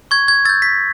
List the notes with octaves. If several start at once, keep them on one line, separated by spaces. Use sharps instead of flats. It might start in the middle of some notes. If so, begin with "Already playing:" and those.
C#6 G#6
G#6
E6 G6 A6
B6